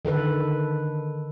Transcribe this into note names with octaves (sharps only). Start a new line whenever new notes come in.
D3 D#3 A4 B4